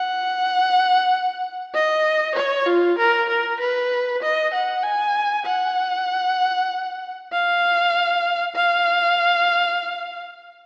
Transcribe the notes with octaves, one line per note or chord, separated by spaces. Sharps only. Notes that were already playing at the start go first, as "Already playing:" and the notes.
Already playing: F#5
D#5
C#5
F4
A#4
A#4
B4
D#5
F#5
G#5
F#5
F5
F5